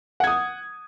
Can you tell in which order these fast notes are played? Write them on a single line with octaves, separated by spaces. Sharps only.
F#5 G#6 D#6